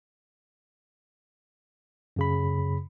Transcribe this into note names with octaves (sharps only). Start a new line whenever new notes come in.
F#2 C#3 B5